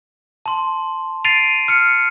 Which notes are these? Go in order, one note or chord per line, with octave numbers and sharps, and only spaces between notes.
A5 C6
A6 C7 D7 D#7 F7
F6 C#7